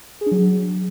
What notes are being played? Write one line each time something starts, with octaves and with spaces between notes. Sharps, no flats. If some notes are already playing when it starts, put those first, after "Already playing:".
G#4
D4
F#3